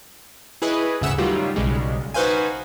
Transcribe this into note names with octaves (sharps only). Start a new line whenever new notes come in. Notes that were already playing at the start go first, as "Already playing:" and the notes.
E4 G#4 B4 C#5 D#5
G1 D2 C#3 E5 F#5 E6
D#3 F#3 G3 A3 F4
B1 C#3 G3 G#3
D#4 F#4 B4 C5 F5 G#5